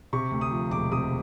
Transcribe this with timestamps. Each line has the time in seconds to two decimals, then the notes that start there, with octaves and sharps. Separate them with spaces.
0.13 C3 C#6
0.31 D2
0.41 D#6
0.51 F3
0.71 E1 D6
0.92 C3 D#6